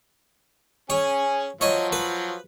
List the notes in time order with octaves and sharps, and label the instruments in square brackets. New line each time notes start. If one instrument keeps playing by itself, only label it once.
[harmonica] C#4 G#4 G#5 [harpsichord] C#5
[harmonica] F3 F#3 [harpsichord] C#5 D#5
[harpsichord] B4